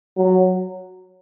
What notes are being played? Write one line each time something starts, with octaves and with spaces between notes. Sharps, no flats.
F#3